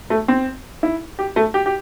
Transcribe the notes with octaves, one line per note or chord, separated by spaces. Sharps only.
A3
C4
E4
G4
A3
G4
G4